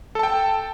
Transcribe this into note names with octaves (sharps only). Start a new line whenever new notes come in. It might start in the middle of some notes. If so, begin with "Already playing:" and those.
A4 G5 A5